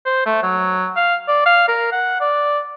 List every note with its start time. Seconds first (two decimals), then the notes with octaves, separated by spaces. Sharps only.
0.06 C5
0.26 A3
0.43 F#3
0.96 F5
1.28 D5
1.46 F5
1.68 A#4
1.92 F#5
2.21 D5